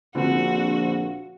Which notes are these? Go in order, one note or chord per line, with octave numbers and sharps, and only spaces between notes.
A#1 D3 B3 C4 F4 F#4